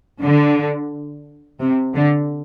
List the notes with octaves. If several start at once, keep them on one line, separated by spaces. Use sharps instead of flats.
D3
C3
D3